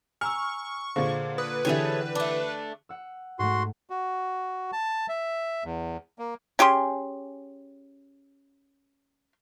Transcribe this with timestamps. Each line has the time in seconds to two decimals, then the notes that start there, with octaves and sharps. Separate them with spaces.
0.21 G#5 A#5 C#6 E6 F6
0.96 A#2 D3 G#4 C5 F5
1.38 B4 D#6
1.65 D3 E3 A3 G4 G#4 C#5
2.15 A3 D4 D5 D6
2.89 F#5 E6
3.39 G#2 A3 F#4 C6
3.90 F#4
4.73 A5
5.09 E5
5.64 E2
6.19 A#3
6.59 C#4 G4 G#4 C6